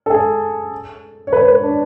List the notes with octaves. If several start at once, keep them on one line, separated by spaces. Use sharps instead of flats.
A4
G#4
C#5
B4
B4
D4